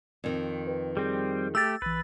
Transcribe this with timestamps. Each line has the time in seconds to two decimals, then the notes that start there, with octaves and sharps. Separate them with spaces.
0.24 F2 D#3
0.67 A#4 B4
0.97 G3 C4 G#4
1.55 A3 G4 E6 A6
1.82 A#1 E3 B4